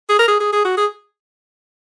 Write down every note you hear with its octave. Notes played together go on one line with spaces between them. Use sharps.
G#4
A#4
G#4
G#4
G#4
F#4
G#4